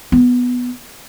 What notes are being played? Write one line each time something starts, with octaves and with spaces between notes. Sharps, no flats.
B3